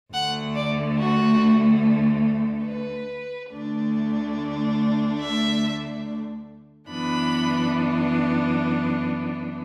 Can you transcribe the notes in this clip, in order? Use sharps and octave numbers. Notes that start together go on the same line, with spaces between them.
D2 D3 A3 F#5
D5
F#4
B4
D2 D3 A3 D4
E5
F#2 E3 B3 D4 B5